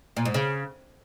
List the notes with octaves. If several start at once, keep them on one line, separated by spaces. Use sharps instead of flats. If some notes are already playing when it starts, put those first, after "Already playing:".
A#2
G#2
C#3